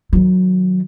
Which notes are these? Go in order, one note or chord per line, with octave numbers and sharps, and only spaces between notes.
D#3 F#3